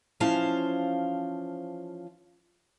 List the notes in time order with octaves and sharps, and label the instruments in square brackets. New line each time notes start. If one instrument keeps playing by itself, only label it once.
[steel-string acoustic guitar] E3 F3 C#4 C5 F5 A5